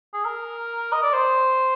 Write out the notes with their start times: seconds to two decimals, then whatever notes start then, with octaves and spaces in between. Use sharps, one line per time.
0.14 G#4
0.25 A#4
0.93 D#5
1.03 D5
1.13 C5